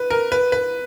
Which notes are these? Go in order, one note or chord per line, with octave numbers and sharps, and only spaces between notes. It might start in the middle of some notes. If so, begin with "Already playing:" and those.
Already playing: B4
A#4
B4
B4